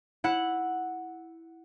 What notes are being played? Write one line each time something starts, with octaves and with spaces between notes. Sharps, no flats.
E4 F#5